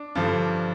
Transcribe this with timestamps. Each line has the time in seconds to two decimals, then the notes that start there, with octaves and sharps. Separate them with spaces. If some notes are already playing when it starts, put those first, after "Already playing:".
Already playing: D4
0.15 G2 D3 F3